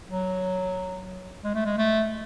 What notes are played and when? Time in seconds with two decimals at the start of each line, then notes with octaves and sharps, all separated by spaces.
0.09 F#3
1.44 G#3
1.55 A3
1.65 G#3
1.78 A3